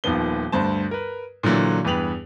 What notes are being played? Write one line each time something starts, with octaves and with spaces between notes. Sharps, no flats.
D#1 D#2 D#3 F3 B3 G7
D2 G2 C5 A5
A#4 B4
A#2 D3 E3 F#3 E4
E2 G2 G4 B4 F7 F#7